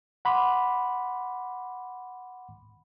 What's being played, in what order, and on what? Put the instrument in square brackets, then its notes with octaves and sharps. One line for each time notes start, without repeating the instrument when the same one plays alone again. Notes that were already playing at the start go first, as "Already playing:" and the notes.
[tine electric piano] F#5 B5 C6 D6